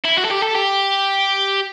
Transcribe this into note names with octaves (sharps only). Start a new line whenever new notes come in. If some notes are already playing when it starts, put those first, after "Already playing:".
E4
F#4
A4
G4
A4
G4